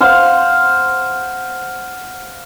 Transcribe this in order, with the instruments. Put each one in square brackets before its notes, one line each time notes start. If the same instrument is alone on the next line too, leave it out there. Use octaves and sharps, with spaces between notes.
[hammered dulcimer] C5 F5 F#5